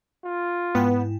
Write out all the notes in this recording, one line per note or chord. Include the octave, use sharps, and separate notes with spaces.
F4
G#2 B3 E4 G5